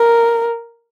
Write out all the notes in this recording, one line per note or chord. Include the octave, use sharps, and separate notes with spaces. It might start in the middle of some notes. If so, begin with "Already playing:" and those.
Already playing: A#4